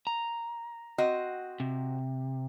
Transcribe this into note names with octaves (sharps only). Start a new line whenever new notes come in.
A#5
C4 F#4 D#5
C3